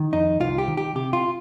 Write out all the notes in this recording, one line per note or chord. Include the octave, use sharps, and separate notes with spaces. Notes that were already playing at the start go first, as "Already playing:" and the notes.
Already playing: D#3
F2 D#4
C2 F4
G4
D#3
G4
C3 G4
F4